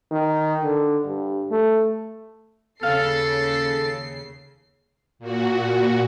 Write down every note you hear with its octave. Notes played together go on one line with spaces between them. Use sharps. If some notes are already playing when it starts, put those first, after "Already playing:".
D#3
D3
G2
A3
D#2 C#3 A4 F5 C7
A#2 F#4